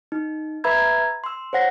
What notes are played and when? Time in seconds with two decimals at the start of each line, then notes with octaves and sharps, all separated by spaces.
0.12 D#4
0.64 B4 E5 A#5 B5 E6 G#6
1.24 C6 E6
1.53 C5 C#5 F#5 A#6